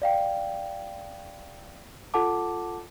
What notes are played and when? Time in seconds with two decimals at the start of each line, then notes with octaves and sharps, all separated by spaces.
0.02 D5 F5 G5
2.14 F4 A4 F#5 A5 D6